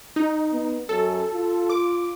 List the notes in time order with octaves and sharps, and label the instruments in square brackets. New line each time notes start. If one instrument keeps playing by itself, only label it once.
[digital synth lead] D#4
[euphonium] B3
[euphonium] F#2 [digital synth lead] A4
[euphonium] F4
[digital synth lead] D6